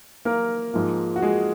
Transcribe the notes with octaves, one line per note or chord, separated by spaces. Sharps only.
A#3 A#4
G#2 F3 A#3
F#4
G#3 G#4